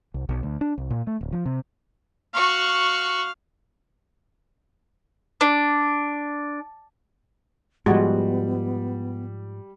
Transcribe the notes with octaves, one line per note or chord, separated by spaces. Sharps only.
C2
B1
D2
D4
C2
A#2
A3
D1
F3
C3
F#4 F5 C#6
D4
G#2 F3 G3 G#3 B3 F#4